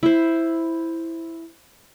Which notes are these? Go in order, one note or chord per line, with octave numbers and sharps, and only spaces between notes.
E4 C5